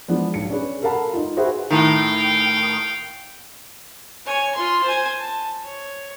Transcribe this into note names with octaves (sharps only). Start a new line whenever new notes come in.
E3 F3 G#3 B3 D4
B1 C#7
C#4 D4 G#4 B4
A4 A#4 F5 F#5 A5 B5
D#4 F4
F#4 G#4 B4 C5 E5 F5
A2 D#3 F5 G5
C#5 G#5
F4 C6
C5 G#5
A5
C#5